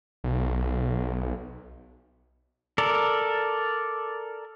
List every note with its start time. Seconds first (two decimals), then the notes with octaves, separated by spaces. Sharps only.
0.24 B1
2.78 A4 A#4 D5